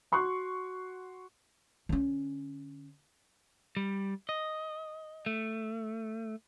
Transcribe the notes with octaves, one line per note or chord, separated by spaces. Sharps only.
F#4 C6 C#6 F#6
D3 C#4
G3
D#5
A3